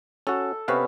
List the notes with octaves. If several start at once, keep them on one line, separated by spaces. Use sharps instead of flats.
C#4 F#4 A4
C3 B3 C#4 B4 F5